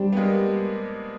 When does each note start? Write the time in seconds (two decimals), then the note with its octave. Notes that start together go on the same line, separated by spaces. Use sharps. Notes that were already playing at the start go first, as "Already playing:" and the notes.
Already playing: G3 C4 D4
0.13 B3
0.17 G#3 A#3